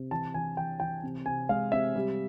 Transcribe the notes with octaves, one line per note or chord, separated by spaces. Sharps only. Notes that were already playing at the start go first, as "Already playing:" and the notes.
Already playing: C3
E3 A5
E3 G#5
E3 G5
E3 G5
C3
C3 G#5
G#3 F5
C3 E5
G3